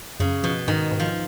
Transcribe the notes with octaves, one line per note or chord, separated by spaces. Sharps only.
F#2 C#3
B2 F3
G#2 D#3
G#2
F3